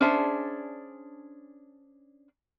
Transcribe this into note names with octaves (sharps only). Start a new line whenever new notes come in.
C#4 D4 G#4 C5 E5 A5